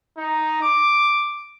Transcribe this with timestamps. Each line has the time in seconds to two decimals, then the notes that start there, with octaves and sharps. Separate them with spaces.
0.18 D#4
0.62 D6